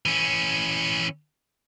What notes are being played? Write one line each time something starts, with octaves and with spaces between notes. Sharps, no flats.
E3 C#4